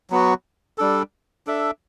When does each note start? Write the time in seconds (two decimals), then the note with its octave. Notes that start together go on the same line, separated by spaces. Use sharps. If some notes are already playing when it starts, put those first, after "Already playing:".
0.10 F#3 B3 F#4
0.78 G3 D4 A4
1.47 D4 A4 E5